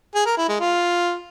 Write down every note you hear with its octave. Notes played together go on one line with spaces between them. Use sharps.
G#4
A#4
E4
G#3
F4